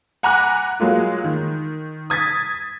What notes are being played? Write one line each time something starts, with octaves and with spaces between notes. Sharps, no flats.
F#5 G#5 A#5 B5 D6 F#6
F#3 G#3 A#3 F4
D#3
D#6 G#6 A6 B6